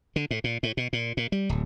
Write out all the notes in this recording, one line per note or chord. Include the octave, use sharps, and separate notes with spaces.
D3
A2
A#2
A2
B2
A#2
A#2
G3
D1